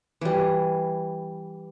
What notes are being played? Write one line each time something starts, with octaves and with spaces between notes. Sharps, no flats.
E3 G3